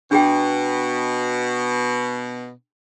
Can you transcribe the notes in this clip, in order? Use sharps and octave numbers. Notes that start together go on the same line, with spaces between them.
B2 D4 G#4 G5